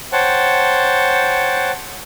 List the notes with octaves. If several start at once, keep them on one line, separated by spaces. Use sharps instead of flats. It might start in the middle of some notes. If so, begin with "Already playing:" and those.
C5 C#5 F#5 G5 A5